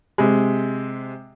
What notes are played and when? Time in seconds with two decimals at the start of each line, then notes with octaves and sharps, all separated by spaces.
0.18 C3 G#3